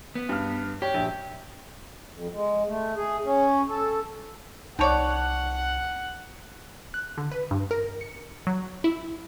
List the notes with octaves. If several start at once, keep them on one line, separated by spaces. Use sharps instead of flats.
B3
G2 F6
G4 C#5
A#1
F2
G#3
A3
G#4
C#4
A4
C2 C4 D#4 C#5 D5 F#5 A5 F7
F#6
D3
B4
G2
A#4
C#7
F#3
E4